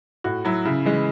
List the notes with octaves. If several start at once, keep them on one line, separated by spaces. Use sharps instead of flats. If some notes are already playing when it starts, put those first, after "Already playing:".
A2 F#4
F#3 E4
C#3 E4
E3 G#3